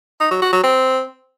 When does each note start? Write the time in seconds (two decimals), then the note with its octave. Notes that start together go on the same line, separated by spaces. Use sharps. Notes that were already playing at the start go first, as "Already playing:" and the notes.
0.20 D#4
0.31 F#3
0.42 F#4
0.53 F#3
0.64 C4